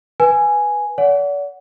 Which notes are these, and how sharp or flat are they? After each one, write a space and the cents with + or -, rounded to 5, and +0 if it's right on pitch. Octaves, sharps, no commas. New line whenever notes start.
B4 +0 G#5 +0
D5 -45 F#5 +0